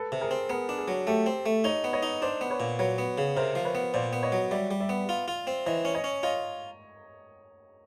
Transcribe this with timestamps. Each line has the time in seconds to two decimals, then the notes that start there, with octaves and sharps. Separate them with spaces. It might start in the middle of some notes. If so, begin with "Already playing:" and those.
Already playing: A4 B4
0.12 C3
0.21 G#4 A#4
0.31 C4
0.49 B3 G#4 A#4
0.69 D4
0.78 G#4 A#4
0.88 F#3
1.07 A3 G4 A4
1.26 C4
1.46 A3
1.64 D#4 C#5 D#5
1.84 B3
1.93 C#5 D#5
2.03 D#4
2.22 D4 C5 D5
2.41 B3
2.51 B4 C#5
2.60 A#2
2.79 F#3 B4 C#5
2.98 B3
3.18 C#3
3.36 C3 A#4 C5
3.55 F3
3.65 B4 C#5
3.75 B3
3.94 A#2 C5 D5
4.13 B3
4.23 C#5 D#5
4.32 F#3
4.51 G3 D5 E5
4.71 G3
4.80 D5 E5
4.89 B3
5.09 F4
5.28 F4
5.47 C4
5.66 E3 C#5 D#5
5.85 C#4
5.95 C#5 D#5
6.04 C#4
6.23 F4 C#5 D#5